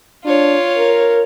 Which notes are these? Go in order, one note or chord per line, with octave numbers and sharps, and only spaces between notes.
D4 F4 C#5
A#4